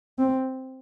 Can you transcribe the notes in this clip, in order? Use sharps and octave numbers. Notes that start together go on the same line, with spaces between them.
C4